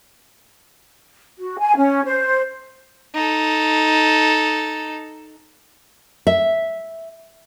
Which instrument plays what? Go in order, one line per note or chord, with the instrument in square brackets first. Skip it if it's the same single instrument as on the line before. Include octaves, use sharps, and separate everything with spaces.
[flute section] F#4
G#5
C#4
C5
[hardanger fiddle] D#4 A4
[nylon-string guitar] E5